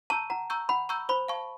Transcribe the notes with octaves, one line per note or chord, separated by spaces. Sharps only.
A5 A#5 C#6 E6 G6
F#5 A#5
A#5 C#6 E6 G6
F#5 B5
A#5 C#6 E6 G6
C5 B5
F5 A5 C#6